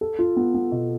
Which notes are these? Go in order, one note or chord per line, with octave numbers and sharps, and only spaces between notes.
A4
F4
B3
B3
B2